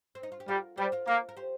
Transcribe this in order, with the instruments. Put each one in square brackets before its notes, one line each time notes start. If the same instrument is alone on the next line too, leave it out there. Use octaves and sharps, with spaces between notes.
[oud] C4
D#4
F4
G4
[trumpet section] G3 [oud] F4 A#4
[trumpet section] G3 [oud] G4 C5
[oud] F4 A#4
[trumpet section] A#3 [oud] F4 A#4
[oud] A#4
G4 C5